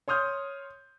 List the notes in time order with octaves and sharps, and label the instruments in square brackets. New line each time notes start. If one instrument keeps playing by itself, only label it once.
[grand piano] C#5 C6 D#6 F6 G6